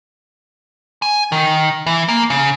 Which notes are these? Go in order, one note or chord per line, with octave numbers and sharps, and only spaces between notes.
G#5
D#3
E3
A#3
C#3